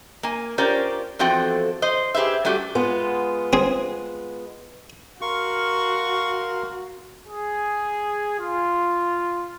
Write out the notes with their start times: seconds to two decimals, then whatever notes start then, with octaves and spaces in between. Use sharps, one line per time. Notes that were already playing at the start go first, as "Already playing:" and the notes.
0.23 A#3 G#5
0.58 C#4 F4 G4 A#4 C5 D5
1.19 E2 F3 C4 F#4 A4 G5
1.82 C5 D#5
2.15 G4 G#4 B4 C5 E5
2.45 G3 A3 C#4 F#4 G4
2.75 G#3 B3 F4
3.53 C4 G#4
5.22 F#4 A#4 F5 C6 C#6
7.28 G#4
8.39 F4